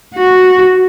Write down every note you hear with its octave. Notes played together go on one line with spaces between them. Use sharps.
F#4